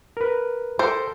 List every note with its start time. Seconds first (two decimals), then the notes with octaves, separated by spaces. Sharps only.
0.17 A#4 B4
0.79 A4 A#4 C5 G5